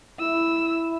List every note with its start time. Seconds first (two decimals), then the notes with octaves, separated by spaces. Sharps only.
0.20 E4 E6